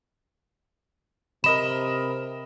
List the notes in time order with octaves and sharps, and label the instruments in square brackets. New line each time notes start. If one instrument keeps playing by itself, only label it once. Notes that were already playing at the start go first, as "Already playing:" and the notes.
[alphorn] C3 [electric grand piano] A#4 D#5 B5 [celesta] E7